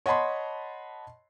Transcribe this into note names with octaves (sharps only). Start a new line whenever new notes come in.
C#5 D#5 F#5 A5 B5 C6